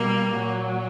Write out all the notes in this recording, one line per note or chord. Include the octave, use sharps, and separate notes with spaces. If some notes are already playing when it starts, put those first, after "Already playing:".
Already playing: B2 G3 A#3
A#2 F#3